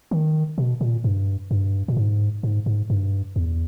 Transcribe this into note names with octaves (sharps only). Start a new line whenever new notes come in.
D#3
B2
A#2
G2
G2
A#2
G#2
G#2
G#2
G2
E2